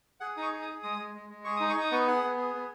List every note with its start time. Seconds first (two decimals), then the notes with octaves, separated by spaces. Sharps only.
0.20 G#4 F#5
0.37 D#4 D#6
0.42 C#6
0.52 G#4
0.62 D#6
0.68 G#4
0.83 G#3 D#6
0.98 G#3
1.14 G#3
1.29 G#3
1.45 G#4 C#6
1.57 D#4 D#6
1.69 C#6
1.76 D#4 D#6
1.91 B3 C#6
2.07 G#4 F#5
2.23 B3
2.37 G#4
2.54 B3